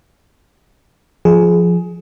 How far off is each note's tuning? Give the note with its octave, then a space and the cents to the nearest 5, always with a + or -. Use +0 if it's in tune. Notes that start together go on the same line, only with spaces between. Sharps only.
F3 +0 G#4 +15